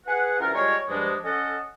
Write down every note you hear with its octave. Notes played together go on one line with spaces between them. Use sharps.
G#4 B4 F#5
C2 E3 C#4 F4 A#4
G3 G#3 F4 A#4 C#5
G2 F3 G#3 D4
C#4 A4 D#5 F#5